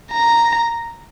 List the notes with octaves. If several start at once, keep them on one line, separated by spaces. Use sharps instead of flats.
A#5